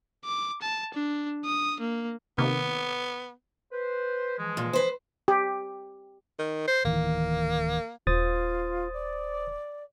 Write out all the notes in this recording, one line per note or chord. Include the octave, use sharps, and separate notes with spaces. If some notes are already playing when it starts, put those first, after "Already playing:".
D6
A5
D4
D#6
A#3
C3 D#3 A#3 B3
B4 C5
E3 F3 G#3
A#2
B4 C5
G4
D#3
C5
D1 D#3 E3 A#3
D#1 F4 C5 D#6 A6
D5